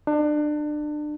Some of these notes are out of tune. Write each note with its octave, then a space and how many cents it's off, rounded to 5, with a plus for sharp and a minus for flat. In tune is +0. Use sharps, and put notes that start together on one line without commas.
D4 +30